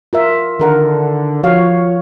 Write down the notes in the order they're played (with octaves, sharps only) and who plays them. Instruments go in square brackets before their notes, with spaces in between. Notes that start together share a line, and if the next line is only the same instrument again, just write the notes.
[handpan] F4 A#4 E5
[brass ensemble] D3 [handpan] D#3 A#4 F#5
[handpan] F3 F#4 F5 [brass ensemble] F4 C#5